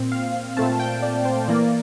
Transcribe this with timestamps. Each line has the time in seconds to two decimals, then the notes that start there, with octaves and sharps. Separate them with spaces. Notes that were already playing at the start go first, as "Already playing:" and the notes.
Already playing: A#2 C4
0.12 F5
0.57 A#2 A3 C4 A5
0.80 G5
1.02 D5
1.25 C5
1.48 E3 A#3 D5